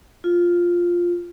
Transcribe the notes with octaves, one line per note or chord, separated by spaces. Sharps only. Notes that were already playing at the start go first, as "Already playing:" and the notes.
F4